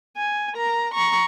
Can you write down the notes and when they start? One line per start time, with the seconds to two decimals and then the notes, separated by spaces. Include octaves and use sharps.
0.17 G#5
0.54 A#4 A#5
0.93 A#5 C#6